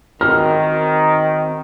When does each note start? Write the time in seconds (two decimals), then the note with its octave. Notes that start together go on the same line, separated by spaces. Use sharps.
0.21 D#3 C4 F#4 A#4 F6